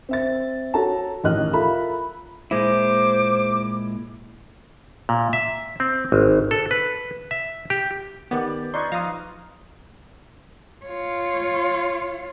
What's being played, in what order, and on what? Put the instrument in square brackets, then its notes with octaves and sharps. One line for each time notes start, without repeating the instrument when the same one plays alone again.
[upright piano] C4 E5 A6
F#4 A4 C#5 A5 A#5
A1 D#2 G4 D#5 F6 F#6
F4 A4 A#4 E5 A#5 B5
[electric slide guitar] A#2 G#3 E4 [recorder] C5 [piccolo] D6
[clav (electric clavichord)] A#2
E5
C4
G#1
A4
B4
E5
G4
[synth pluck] D#3 B3 [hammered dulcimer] G4 D5
[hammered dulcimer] D#4 F4 B4 [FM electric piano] D5 D#5 C#6 [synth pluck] C6 G#6
[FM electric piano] F3 D#6 [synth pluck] F5 A#5
[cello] F4 C#5